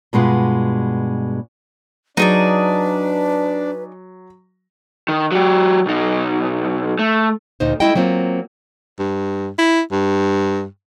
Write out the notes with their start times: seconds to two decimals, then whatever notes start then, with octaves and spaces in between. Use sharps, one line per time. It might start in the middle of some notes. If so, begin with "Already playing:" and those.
0.13 G2 B2 G#3 F4 F#5
2.17 F#3 D4 D#4 G#4 B4 D5
5.09 D#3
5.32 F#3 G4
5.86 B1 D#4
6.99 A3
7.60 D2 A#2 D#4 C5
7.80 G#3 A3 E4 A4 D#5 G5
7.95 F#3 A#3 C4 F4
8.99 G2
9.58 E4
9.92 G2